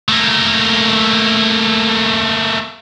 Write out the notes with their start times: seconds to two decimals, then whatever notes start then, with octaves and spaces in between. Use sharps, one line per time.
0.09 A3 A#3